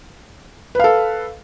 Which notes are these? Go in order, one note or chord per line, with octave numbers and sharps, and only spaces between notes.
A4 B4 F5